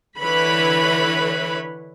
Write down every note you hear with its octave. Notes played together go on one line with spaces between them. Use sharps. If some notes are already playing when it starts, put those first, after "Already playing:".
D3 E3 E4 B4 C#5 B5